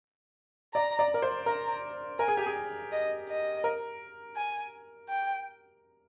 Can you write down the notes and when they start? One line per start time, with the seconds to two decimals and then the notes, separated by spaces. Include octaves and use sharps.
0.74 D5 A#5
0.99 D5
1.14 A#4
1.22 C5
1.46 A#4 A#5
2.19 A#4 G#5
2.28 G#4
2.37 G4
2.46 G#4
2.92 D#5
3.28 D#5
3.64 A#4
4.36 G#5
5.09 G5